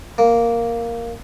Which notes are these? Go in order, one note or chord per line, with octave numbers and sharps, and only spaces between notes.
A#3